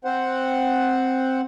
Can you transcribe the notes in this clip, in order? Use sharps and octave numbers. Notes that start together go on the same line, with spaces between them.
C4 C5 F#5